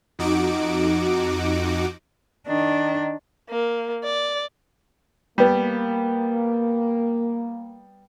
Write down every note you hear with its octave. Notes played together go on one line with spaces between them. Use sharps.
F2 D#4 F#4 D6 D7
D#3 D4
A#3
D5
G3 A#3 B3